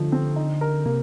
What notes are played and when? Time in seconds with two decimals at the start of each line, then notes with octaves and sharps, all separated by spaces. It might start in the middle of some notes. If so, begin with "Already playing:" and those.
Already playing: D3 F3 A3 D#4
0.12 C4
0.36 D#4
0.61 A#4
0.86 C3 A#3